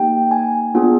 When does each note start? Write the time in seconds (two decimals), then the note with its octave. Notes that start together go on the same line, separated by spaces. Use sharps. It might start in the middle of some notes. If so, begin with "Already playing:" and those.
Already playing: A#3 D#4 G4 G5
0.31 G#5
0.75 B3 D4 F4 G#4